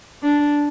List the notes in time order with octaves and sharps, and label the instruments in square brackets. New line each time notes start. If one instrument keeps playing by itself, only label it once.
[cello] D4